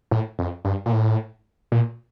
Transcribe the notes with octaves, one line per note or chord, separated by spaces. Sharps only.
A2
F2
G2
A#2
A2
A#2